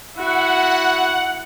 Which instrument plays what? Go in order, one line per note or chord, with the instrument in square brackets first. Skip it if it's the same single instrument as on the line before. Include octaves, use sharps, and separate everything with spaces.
[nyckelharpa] E4 F#4 [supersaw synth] F#5